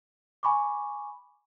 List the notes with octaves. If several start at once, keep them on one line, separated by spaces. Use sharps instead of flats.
G#5 B5 C#6 D6